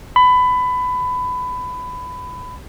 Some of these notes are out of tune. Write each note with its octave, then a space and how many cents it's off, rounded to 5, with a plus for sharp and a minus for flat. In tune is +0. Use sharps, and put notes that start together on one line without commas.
B5 +20